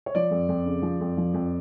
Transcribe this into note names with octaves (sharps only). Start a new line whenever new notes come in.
C#5
F3 D5
F2
F2
C#3
F3
F2
F3
F2